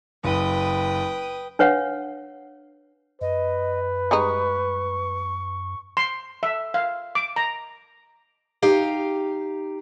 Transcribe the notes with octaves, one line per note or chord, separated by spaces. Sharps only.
F#1 B4 G5 D#6
D4 B4 C#5 F5 F#5
F#2 B4 D#5
G3 G#3 D#4 C#6
C6
E5
F5
D6
A#5
D#4 G4 F5